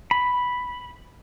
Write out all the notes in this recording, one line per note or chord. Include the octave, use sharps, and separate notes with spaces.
B5